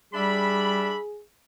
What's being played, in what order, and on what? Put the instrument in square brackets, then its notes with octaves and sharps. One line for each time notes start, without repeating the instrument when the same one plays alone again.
[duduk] G3 [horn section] D4 E5 B5 [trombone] G#4